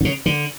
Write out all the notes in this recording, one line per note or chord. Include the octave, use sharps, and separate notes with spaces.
D3
C#3
D3